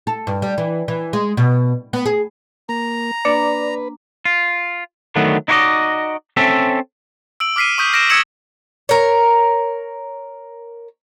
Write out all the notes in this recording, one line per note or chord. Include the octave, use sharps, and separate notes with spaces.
A4
G2
G3
E3
E3
G#3
B2
B3
G#4
A#3 A#5
A#3 D4 B4 D5
F4
D3 D#3 F#3 A3 B3
D#4 E4 F#4 C5 D5 D#5
C4 C#4 A4 E5
E6 D7 F#7
D6 F6 B6 C7 D#7
C#6 D#6 G6 B6
F6 A#6 D7 E7
D#6 E6 G#6 C#7 E7 F#7
A#4 C#5